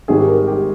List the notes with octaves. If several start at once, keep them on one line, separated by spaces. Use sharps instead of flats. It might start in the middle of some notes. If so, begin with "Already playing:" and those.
G#1 G#2 D#3 G3 G#4
A#4
G4